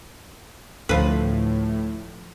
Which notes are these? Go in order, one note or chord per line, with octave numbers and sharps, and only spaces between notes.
D2 A2 F3 B4